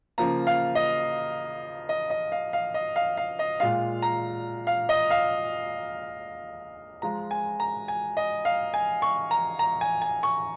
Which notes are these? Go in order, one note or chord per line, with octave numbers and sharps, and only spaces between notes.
C#3 F3 A#3 A#5
F5
D#5
D#5
D#5
F5
F5
D#5
F5
F5
D#5
A#2 G#3 F4 F5
A#5
F5
D#5
F5
F3 G#3 F4 A#5
G#5
A#5
G#5
D#5
F5
G#5
C#6
A#5
A#5
G#5
G#5
C#6